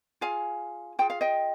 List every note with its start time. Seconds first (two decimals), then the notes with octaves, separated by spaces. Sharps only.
0.21 F4 G#4 F5 G#5
0.99 F4 G#4 G5
1.10 F5
1.21 D#5 G5